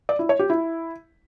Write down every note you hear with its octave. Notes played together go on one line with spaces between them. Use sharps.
D5
E4
C#5
G4
E4